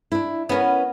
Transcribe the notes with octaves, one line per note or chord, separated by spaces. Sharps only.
D4 E4
B3 C#4 A#4 B4 C#5